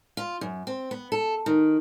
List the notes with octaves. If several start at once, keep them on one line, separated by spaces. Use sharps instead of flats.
F4
F#2
C4
B3
A4
D#3